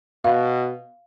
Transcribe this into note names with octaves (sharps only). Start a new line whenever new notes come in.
B2 F5